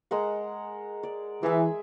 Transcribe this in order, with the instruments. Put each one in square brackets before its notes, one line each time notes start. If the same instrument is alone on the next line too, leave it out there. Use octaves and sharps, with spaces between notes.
[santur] G#3 A#4 F#5
D5
[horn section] E3 [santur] G#4 E5